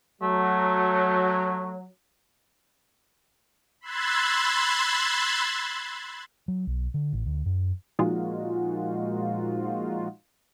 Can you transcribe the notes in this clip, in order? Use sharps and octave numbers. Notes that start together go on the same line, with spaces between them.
F#3 A3
B5 C6 E6 F#6 G#6 A6
F#3
B1
D3
A1
D2
F#2
A#2 F3 G#3 D#4 F4 F#4